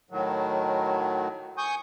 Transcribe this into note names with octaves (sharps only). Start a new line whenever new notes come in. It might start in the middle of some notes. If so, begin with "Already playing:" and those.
A2 D#3 F#3
G#5 C#6 D#6 G6